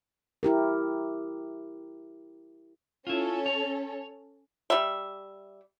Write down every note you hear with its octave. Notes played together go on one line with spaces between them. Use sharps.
E4 G4 A#4
C#4 E4 F4 A4
C#5
G3 E5